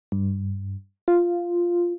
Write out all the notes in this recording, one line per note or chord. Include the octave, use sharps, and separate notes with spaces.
G2
F4